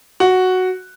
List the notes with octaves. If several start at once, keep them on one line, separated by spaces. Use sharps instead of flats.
F#4